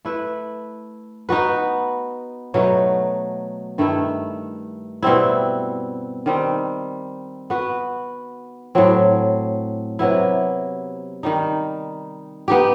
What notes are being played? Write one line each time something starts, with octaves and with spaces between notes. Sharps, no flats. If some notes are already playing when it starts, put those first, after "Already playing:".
A3 E4 B4
B3 D#4 F#4 B4
B2 F#3 A3 D#4
G2 D#3 A3 E4
B2 G3 C4 E4
D#3 G3 C4
B3 F#4 B4
A2 F#3 C4
C3 F#3 B3 E4
D#3 G3 D#4
B3 D#4 G4